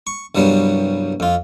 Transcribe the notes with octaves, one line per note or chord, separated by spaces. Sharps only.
C#6
C2 G2 F#3 G3 B3
F2 F4